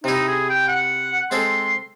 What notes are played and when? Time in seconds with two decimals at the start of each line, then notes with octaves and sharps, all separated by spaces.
0.04 C3 D#4 E4
0.28 G#4
0.50 G5
0.68 F#5
1.31 G#3 C4 A4 C6